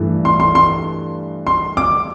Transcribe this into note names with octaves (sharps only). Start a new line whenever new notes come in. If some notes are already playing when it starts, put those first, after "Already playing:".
Already playing: G2 E3 A3
C6
C6
C6
C6
D6